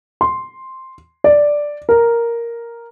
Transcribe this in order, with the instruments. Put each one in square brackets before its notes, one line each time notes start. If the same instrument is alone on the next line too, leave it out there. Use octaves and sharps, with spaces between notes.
[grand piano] C6
D5
A#4